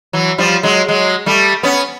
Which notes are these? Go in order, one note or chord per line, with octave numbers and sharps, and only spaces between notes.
E3 F#3
F3 G3
F#3 G#3
F#3 G#3
G3 A3
B3 C#4